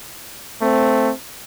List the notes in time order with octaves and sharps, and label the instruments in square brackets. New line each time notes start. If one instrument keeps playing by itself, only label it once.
[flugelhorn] A3 [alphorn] C4